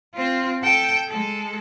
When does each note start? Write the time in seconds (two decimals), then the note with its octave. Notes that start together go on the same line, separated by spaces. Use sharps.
0.15 C4 F4
0.63 A4 G5
1.08 G#3 A4